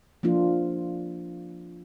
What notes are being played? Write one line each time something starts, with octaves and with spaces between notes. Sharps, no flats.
F3 A#3 D4 F4